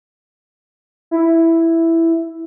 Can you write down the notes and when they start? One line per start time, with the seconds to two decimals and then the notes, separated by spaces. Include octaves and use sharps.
1.11 E4